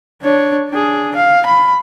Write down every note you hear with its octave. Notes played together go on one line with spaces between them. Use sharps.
D4 C#5
D4 G#4
F5
B5